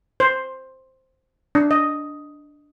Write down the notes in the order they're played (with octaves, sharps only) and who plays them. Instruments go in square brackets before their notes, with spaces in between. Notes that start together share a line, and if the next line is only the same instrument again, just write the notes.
[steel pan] C5
D4
D#5